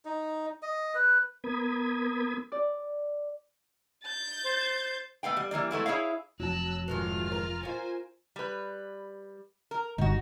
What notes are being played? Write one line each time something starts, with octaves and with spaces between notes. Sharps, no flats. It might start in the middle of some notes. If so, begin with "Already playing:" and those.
D#4
D#5
B4
B3 A#4 B5 D#6 G#6
D5
G6 A6
C5
A3 B3 F5 G5
G3
E3 G3 A#3 D5
G#3 A3 B3 E4
E4 G#4 C#5 E5 F5
F1 F#3 A5 E6 F#6
G#2 D#3 E3 F4 F6
A#4
C#4 F4 C5 G#5
G3 B4
A#4
G1 D#4 F#4